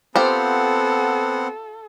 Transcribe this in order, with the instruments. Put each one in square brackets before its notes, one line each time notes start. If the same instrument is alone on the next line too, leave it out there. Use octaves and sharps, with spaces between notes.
[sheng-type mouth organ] B3 C4 F#5 [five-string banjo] F4 G4 C5 [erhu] A4